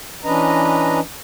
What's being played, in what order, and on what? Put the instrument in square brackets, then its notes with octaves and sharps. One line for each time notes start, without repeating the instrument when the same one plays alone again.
[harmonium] E3 C#4 D4 B4 D#5 A#5